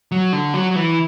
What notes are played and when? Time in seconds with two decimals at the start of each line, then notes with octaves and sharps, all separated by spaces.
0.12 F#3
0.33 D3
0.54 F#3
0.71 F#3
0.76 E3